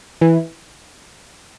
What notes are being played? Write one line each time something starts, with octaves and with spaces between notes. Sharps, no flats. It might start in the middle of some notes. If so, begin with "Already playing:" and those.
E3